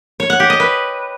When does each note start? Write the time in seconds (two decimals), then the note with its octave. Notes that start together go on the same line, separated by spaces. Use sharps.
0.20 C#5
0.30 F#5
0.40 G4
0.50 D#5
0.60 B4